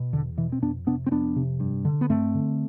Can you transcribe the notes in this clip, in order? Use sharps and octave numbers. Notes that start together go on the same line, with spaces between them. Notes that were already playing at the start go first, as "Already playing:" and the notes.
Already playing: B2
E2 D3
B2 E3
C4
F2 B3 D4
C3 B3 D4
C4
F2 B3 D4
C3
G2
D3
B3
G2 A3 C4
D3